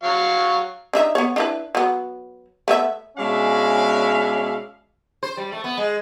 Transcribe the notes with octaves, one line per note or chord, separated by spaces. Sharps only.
F#3 F5 C#6
D4 D#4 E5
B3 C#5
D4 E4 B4
F#3 B3
A3 B3 E5
B2 G#3 C#4 D4 E5 F5
C5
G3
A3
B3
G#3